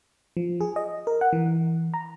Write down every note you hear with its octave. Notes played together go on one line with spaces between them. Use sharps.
F3
G#4
D#5
A#4
F#5
E3
A#5